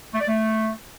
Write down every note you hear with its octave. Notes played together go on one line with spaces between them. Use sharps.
A3
D5
A3